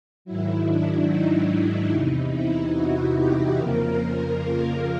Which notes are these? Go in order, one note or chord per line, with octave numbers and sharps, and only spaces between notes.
G#2 D#3 F#3 E4
D4
D#4
D#4
E2 C3 E3 D#4
E4
F#4
G4
F2 C#3 F3 A#3 A#4
F4